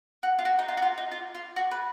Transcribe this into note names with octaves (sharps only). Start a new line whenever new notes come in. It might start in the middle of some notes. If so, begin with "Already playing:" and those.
F#4
F4
F#4
D#4
F4
F#4
F4
D#4
F4
F4
F#4
B4